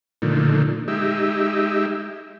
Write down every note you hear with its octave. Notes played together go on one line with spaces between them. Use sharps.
A#2 D3 D#3 F3 A3
G#3 D#4 G4 E5